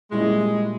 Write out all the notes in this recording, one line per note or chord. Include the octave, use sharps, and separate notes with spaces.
A#2 G3 G#3 C#4 E4